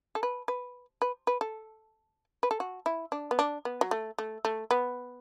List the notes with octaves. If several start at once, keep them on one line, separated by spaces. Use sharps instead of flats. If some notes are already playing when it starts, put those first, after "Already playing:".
A4
B4
B4
B4
B4
A4
B4
A4
F#4
E4
D4
B3
D4
B3
F#3
A3
A3
A3
B3